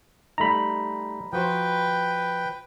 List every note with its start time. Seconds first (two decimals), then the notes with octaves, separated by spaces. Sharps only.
0.38 G3 A3 D#4 A#5 B5
1.33 F3 F#4 B4 C5 G5